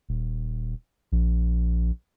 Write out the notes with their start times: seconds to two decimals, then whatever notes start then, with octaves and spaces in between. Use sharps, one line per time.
0.09 D#1
1.12 A#1